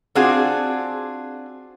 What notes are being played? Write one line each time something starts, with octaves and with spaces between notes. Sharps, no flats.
C4 D4 F4 F#4 G#4